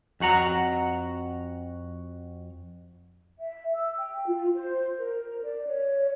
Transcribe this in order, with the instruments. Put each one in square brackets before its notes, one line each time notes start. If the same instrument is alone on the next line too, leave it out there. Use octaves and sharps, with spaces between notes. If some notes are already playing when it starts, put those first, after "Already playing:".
[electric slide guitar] F2 F#4 F#5 A#5
[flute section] E5
E6
G5
F4
C5
A#4
D5
C#5